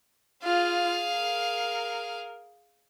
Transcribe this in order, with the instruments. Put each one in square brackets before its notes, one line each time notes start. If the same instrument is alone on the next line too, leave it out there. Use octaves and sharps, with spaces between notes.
[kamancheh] F4 [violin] G#4 F5
[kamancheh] A#4